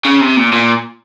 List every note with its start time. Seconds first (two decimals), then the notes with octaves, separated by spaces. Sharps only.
0.05 C#3
0.20 C3
0.37 A#2
0.53 A#2